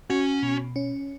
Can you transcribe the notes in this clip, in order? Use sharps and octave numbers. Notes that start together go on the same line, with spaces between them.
C#4 F#4
B2
C#4